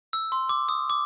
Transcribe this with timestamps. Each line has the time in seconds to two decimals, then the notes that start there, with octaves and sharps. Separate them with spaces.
0.13 E6
0.32 C6
0.49 D6
0.69 D#6
0.90 D6